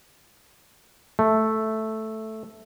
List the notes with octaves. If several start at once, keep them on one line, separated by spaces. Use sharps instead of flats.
A3